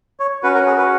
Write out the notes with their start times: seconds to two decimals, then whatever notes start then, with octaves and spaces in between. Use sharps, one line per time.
0.20 C#5
0.43 C#4 F#4 B4
0.55 A#4
0.67 G#4
0.78 B4